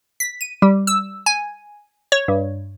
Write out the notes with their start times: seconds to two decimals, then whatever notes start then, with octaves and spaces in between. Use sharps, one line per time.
0.20 B6
0.41 D#7
0.62 G3
0.87 E6
1.26 G#5
2.12 C#5
2.28 G2